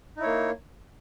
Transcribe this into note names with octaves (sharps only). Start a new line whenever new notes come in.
A#3 D#4 E4 C#5